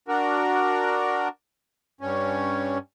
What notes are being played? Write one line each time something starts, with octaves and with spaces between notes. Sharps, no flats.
D4 F#4 A#4
G2 C#4